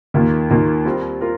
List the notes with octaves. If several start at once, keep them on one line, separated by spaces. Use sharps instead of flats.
D#2 D#3 A#3 F4
D#2 D#3 A#3 F4
G3 C4 F4 A#4
F4 A#4